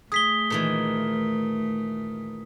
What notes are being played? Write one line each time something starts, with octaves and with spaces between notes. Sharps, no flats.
A3 G#4 D#6 B6 G7
A#2 D#3 E3